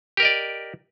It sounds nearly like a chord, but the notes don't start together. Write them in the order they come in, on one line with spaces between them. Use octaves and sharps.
G4 A#4 D#5 D5